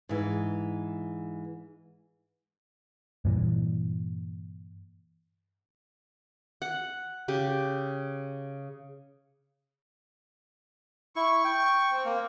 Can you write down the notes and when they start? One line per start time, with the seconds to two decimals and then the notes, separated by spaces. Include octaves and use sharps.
0.09 G#2 E3
3.25 G2 A#2 E3
6.62 F#5
7.28 C#3 G4
11.16 E4 C#6
11.44 G5
11.91 C4
12.05 A#3